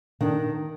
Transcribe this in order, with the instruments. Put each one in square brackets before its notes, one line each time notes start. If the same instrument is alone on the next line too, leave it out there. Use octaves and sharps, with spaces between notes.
[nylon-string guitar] D#3 D4